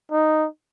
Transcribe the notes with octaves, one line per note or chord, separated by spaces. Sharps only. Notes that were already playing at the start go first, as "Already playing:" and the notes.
D#4